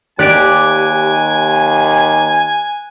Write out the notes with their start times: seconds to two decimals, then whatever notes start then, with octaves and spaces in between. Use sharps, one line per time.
0.19 D#2 G4 D5 G#5 F#6 D7